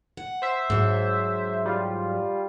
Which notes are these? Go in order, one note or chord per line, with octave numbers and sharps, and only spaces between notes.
F#5
C5 E5
G#2 F#3
G3 F4